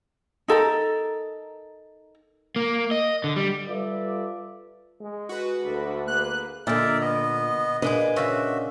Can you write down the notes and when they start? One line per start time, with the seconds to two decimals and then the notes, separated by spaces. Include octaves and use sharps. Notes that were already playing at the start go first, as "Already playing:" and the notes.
0.48 D#4 A4 A#4 A#5
2.56 A#3
2.91 D#5
3.24 D3
3.36 G3
3.68 G3 F4 A4 B4 D5 E5
5.01 G#3
5.29 F#4 B4
5.64 D2 D4 A4 B5
6.08 A#3 G#4 B4 F#6
6.67 A#2 D3 D#4 A#4 D5 E5
7.01 B3 D#5
7.82 A#2 G#3 D4 G#4 B4 D#5
8.16 C#3 F4 F#4 E5